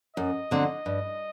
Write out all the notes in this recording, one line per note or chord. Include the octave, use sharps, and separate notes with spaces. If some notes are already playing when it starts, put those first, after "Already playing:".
F#2 D#5
D3 F#3 C4
G2